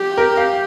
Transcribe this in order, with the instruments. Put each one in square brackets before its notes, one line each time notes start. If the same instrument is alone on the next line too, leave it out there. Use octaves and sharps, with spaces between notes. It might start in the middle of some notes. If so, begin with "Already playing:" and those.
Already playing: [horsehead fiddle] G4
[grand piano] A#4
F5